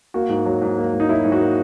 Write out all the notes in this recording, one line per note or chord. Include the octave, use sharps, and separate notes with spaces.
A#3 F#4
G#2
F#3
G#2
A#3
G#2
D#4
F#3 E4
G#2
F#4
A#3